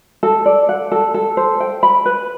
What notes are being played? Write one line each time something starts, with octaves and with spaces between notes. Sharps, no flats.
A4
D5
F#5
A4
A4
C5
G5
B5
B4